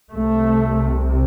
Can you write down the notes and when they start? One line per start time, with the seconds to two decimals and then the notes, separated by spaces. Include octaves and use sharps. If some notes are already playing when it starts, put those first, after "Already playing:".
0.13 C2 C3 A3